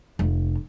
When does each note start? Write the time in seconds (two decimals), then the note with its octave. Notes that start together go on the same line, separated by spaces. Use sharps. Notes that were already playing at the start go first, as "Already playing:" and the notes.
0.19 F1